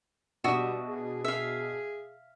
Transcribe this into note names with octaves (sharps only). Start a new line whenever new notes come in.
B2 G3 D4 F#4 E5 D#6
G#4
G#4 E5 F5